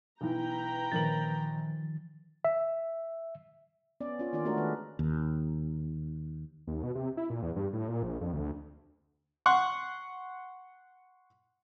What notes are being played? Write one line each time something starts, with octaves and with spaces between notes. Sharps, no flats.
B1 E3 B4 G5 A#5
A#1 D#3 F3 A#4 A6 F#7
E5
B3 C#4 D5
C#4 F4
D#3 A#3 D4 F4 D5
G#3 A3 C#4 D4 F#4 A#4
D#3 B4
D#2
D#2
B2
C3
E4
A#2
E2
G2
A2
A#2
A#1
F2
D2
F#5 C6 C#6